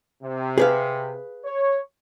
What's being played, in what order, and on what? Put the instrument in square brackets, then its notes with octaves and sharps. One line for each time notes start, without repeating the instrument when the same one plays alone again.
[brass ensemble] C3
[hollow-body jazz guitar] G#4 B4 F5
[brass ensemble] C#5